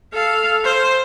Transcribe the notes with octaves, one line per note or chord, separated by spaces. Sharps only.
A4 F5
C5